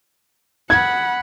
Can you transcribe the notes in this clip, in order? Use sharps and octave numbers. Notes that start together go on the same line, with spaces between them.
F#5 B5 G#6